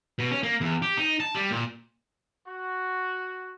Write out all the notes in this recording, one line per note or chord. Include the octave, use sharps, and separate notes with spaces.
B2
C#4
A#3
E2
G4
D#4
A5
G3
A#2
F#4